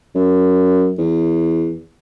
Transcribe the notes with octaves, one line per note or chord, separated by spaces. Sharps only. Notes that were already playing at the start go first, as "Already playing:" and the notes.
F#2
E2